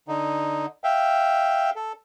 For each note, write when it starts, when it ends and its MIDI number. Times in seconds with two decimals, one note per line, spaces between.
0.08 0.66 50
0.08 0.66 63
0.84 1.70 76
0.84 1.70 77
0.84 1.70 79
1.76 1.92 69